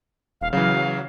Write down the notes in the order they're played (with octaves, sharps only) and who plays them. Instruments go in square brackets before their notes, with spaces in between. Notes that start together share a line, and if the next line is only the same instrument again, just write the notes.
[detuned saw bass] D#1 [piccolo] F5
[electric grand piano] C#3 E3 [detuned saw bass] F#3 [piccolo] F5
[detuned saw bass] F#3